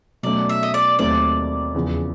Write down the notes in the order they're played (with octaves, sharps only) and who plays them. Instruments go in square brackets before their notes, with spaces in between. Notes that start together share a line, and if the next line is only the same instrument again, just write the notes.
[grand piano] B2 F#3 A3 C#4 [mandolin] D5
[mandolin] E5
D#5
D5
[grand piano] D#2 D#3 F#3 A3 C4 [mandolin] D5
[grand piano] E2 C#3 F3